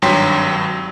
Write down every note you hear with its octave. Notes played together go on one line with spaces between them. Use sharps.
G#1 G2 F#3 G5 C6 B6